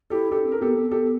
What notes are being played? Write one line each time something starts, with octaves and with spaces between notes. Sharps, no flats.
E4 G4 A4
D4 G4 A4
C4
A#4
B3 G4 A4
B3
G4 A4